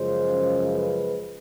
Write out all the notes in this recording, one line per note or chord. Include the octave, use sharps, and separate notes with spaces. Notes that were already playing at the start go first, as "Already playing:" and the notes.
Already playing: F#2 C#3 F3 G#3 C5
B4